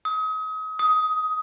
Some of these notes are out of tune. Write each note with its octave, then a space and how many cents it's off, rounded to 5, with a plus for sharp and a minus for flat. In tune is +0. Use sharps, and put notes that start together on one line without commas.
D#6 +35
D#6 +15